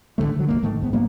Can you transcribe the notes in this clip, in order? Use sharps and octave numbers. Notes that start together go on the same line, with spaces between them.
A1 G2 D3 A3
D3 F#3
D#1 F#2 A#3
G1 G#2 D#3 A3
G1 G#2 B3
G#1 F#3 A#3 B3